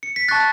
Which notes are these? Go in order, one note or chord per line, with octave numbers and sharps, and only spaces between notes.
C#7
B6
A5 C#6 F#6 A6